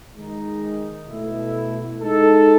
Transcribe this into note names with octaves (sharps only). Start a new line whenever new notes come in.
D#3 G#3 D#4
B2 A3 E4
G#3 D#4 A4